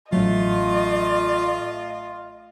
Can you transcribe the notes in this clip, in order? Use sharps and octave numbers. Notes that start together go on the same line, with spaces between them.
A1 F#3 A3 F4 D#5